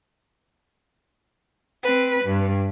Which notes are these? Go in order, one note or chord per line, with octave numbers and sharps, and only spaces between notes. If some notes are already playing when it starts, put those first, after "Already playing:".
C4 B4
G2